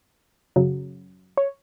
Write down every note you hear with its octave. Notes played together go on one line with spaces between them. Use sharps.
F#2 C#3 F#3
C#5